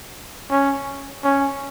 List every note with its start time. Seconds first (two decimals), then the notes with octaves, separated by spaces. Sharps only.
0.50 C#4
1.24 C#4